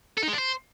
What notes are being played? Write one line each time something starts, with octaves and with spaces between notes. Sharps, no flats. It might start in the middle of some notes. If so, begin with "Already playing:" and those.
A4
D#4
G#3
D4
C5